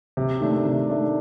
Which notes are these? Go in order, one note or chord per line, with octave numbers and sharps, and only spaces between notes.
C3
D#3 A3 D4
C3
D#3 A3 D4